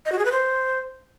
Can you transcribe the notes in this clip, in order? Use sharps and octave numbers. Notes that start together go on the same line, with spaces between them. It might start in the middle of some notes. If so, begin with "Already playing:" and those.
D#5
F#4
G#4
B4
C5